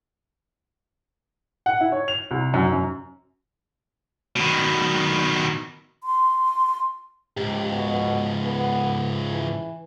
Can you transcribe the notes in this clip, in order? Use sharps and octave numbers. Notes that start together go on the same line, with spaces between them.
F#5
E4
C#5
F7
C2
F#2
F#2
B2 D#3
C6
C#2 G#2 G4
B2
B3
E3